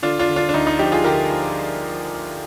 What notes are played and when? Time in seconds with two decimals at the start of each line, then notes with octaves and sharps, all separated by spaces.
0.02 D3 D4 F4
0.19 D4 F4
0.28 D3
0.36 D4 F4
0.49 D4
0.54 D2 D#4
0.67 D#4
0.79 F3 D#4 G4
0.92 F4 G#4
1.05 D3 G4 A#4
1.30 F3